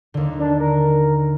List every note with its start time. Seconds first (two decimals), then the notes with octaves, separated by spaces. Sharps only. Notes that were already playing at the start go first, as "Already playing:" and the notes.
0.14 D#2 D3
0.40 D4
0.60 A#4